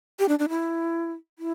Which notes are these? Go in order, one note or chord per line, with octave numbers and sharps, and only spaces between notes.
G4
D4
D4
E4
E4